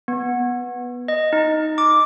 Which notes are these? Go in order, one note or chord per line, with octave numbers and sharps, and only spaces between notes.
B3
D#5
D#4
D6